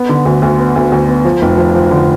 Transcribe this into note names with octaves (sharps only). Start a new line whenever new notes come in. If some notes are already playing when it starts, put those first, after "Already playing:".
Already playing: B3
D3
D2
D2
B3
D2
D2
B3
F3
F1
F3
F3
D3